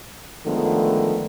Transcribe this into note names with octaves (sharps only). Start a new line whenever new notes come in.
D3 D#3 F3 G#3 A3 B3